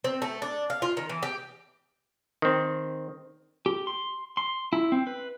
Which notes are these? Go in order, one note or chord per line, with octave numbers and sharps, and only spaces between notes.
C4
A3
D4
F5
F4
D#3
E3
G4
D#3 C4
G4
C6
C6
E4
C4
B4